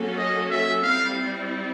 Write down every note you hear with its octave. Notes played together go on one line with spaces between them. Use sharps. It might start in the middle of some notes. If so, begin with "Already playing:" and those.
Already playing: F#3 A#3 C#4 F#4 A4
D#5
E5
G3 C4 E4 F5